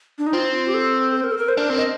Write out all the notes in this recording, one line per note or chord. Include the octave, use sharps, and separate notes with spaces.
D4
D#4
C4 F4
G4
A4
C5
A#4
A4
A#4
C5
D4 A#4
C4
D#5